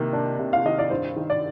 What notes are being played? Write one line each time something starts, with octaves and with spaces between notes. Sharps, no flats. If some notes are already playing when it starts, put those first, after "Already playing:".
Already playing: C3 D#3 A#3
D4
C3
F5
D#3 D#5
D5
G2 C5
D#3
D5